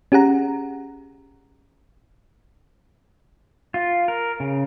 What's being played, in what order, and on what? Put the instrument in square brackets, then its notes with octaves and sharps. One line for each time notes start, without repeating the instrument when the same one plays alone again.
[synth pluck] C#4 G4 G#4 F#5 A#5
[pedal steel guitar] F4
A#4
C#3